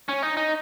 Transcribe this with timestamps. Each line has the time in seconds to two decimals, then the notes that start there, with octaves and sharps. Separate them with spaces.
0.09 C#4
0.23 D#4
0.37 D#4